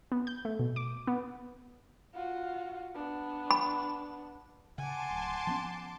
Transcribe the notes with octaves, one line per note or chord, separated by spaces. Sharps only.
B3
G6
A3
B2
D6
B3
F4 F#4
B3 D4
B5
C#3 F#5 G#5 A5 C6 D6
D1
F3 B3 C#4